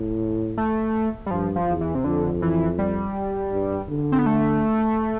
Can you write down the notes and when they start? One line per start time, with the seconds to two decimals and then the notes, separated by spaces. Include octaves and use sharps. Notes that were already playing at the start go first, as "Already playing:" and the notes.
Already playing: A2
0.58 A3
1.26 G3
1.31 G2 F3
1.56 F3
1.68 E2
1.81 E3
1.95 C3
2.04 F2 D3
2.42 E3
2.78 G3
3.53 G2
3.90 D3
4.12 C4
4.19 B3
4.26 A3